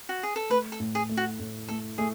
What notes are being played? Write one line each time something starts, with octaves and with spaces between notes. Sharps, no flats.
F#4
G#4
A4
A3 B4
A4
A2
G#4
A3
F#4
A2
A3 A4
A3 G#4